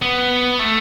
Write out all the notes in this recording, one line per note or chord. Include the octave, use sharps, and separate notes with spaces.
B3
A3